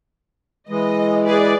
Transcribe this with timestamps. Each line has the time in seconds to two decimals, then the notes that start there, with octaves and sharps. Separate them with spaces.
0.69 E3 G#3 D#5
1.25 G#4 B4 D5